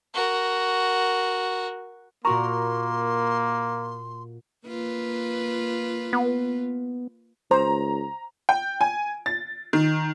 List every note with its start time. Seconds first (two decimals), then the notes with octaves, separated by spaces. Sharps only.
0.14 F#4 A#4
2.25 A#2 A#3 F#4 A#4 A#5 C6 C#6
4.66 A#3 F4 B4
6.13 B3
7.51 C#2 C5 A#5
8.49 G5
8.81 G#5
9.26 A6
9.73 D#3